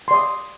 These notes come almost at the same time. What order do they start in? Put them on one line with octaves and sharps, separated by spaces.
C6 D5 D#6